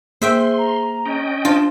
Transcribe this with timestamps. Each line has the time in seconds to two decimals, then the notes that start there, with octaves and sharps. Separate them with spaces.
0.22 A#3 G#4 C5 E5 G5 C6
0.58 A#5
1.06 C#4 D#5 G5
1.45 D4 F4 C5 A5